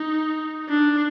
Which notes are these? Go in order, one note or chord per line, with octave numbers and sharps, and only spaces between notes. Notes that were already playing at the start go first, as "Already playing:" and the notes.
Already playing: D#4
D4